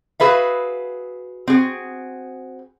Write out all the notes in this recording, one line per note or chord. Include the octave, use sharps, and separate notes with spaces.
F#4 G#4 B4 E5 F5
C4 F#4 G#4